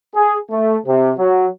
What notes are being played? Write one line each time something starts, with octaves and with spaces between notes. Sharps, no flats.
G#4
A3
C3
F#3